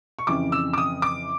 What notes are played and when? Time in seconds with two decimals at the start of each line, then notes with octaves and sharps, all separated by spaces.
0.19 C#6
0.27 F2 C#3 E3 D6
0.52 E6
0.73 D6
0.78 D#6
1.02 D6